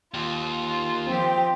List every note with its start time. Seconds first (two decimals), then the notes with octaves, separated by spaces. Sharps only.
0.14 D#2 F4
1.07 F3 C4 G4